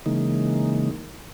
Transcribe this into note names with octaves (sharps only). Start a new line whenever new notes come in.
C#3 E3 G#3 A#3 D#4